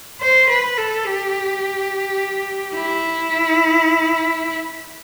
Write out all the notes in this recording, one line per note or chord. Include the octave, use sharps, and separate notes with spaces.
C5
B4
A4
G4
E4